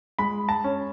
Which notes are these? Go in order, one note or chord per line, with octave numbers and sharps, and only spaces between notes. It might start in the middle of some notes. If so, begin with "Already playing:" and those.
G#3 B5
A5
C#4